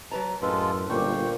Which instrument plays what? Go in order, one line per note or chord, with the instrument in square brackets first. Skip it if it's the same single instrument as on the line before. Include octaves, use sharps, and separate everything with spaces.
[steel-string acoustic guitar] F#3 B4 A#5 [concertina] A5
[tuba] F#2 [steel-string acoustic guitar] A2 B4 [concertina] G#3 F4 A4
[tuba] G1 [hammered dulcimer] A#2 A#3 C5 [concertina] G5 C#6